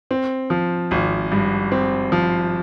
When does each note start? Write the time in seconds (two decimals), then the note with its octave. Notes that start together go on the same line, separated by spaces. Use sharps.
0.11 C4
0.50 F3
0.91 G#1
1.32 G2
1.72 C4
2.12 F3